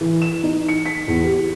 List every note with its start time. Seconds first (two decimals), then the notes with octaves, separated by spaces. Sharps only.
0.01 E3
0.22 E7
0.43 D#4
0.69 C#7
0.86 B6
1.08 E2
1.24 G4